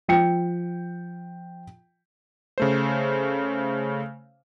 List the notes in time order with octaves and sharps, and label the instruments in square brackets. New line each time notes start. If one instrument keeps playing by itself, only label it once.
[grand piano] F3 G5 C#7
[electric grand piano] C#3 A3 C5